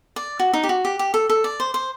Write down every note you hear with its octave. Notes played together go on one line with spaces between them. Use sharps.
D5
F#4
D#4
G4
F#4
G4
G4
A4
A4
D5
C5
C5